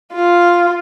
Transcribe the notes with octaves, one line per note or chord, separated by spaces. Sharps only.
F4